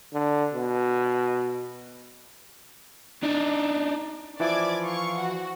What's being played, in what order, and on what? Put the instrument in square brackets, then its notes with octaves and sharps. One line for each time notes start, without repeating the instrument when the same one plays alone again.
[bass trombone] D3
B2
[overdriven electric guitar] D4 D#4
[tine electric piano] E3 F3 E4 [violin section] D5 D6 G#6
[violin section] F5 C#6
F#4 F#5